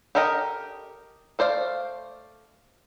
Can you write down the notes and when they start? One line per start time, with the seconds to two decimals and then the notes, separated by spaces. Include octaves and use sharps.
0.15 G4 A4 A#4 D#5 G5
1.39 A3 C5 D5 F5